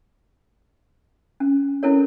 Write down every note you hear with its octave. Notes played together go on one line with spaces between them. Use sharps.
C#4
C#4 E4 A4 A#4 C#5